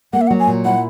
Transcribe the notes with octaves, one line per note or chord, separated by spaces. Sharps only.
A#3 F#5
E5
F#5
F#3
G#5
A#2
E4 F#5